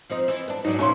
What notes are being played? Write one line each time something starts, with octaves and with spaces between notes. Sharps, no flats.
F3 C4 D#4
E3
B3 D4
G#2 F#3 D4 D#4
F2 A#2 C#4 E4 C6